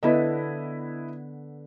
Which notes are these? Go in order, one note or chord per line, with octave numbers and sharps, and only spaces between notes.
D3 B3 E4 A4 B4 D#5